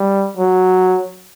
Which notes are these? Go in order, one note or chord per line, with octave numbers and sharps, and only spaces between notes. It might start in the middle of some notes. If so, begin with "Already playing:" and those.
Already playing: G3
F#3